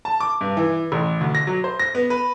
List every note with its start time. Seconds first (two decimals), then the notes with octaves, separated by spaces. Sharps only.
0.05 A5
0.20 D6
0.41 G2
0.57 E3
0.92 A1
1.21 D2
1.35 A#6
1.47 F#3
1.64 C5
1.80 A#6
1.95 B3
2.10 B4